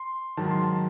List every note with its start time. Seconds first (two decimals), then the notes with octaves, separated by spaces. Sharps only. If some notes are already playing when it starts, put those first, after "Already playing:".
Already playing: C6
0.37 G#2 D#3 F#3 A5
0.51 C6
0.64 A5